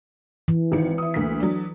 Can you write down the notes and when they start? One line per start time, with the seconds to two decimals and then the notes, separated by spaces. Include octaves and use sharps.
0.48 E3
0.72 G#1 D#3 C#7
0.98 E4 D#6
1.14 D2 A#3 B6
1.40 F#3 D4